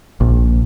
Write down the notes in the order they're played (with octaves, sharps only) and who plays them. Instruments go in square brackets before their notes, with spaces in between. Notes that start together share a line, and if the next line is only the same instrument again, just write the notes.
[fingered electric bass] A#1